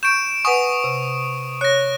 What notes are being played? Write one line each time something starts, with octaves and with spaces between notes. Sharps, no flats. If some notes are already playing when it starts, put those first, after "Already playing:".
C#6 G6 D7 E7
B4 F#5 G#5 C#6 D#6 D7
C3
C#5 F#6 A#6